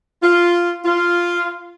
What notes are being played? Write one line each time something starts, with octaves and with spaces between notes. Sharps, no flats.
F4
F4